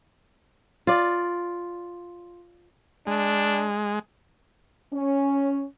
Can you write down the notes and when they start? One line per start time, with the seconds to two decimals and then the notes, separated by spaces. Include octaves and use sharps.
0.87 F4 D5
3.07 G#3 D4
4.93 C#4